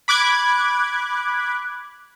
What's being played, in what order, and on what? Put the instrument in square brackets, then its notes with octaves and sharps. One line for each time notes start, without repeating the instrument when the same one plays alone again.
[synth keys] B5 D6 F#6 G#6